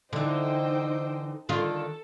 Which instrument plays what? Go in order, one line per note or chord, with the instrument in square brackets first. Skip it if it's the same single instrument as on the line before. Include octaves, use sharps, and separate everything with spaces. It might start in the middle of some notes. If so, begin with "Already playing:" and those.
[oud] D3 E3 [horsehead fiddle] D#4 [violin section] C5 D#5 G5
[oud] D3 D#3 F4 [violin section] A4